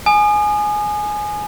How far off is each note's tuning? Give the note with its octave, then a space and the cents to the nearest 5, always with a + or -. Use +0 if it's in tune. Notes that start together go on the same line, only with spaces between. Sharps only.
G#5 +10 D#6 -35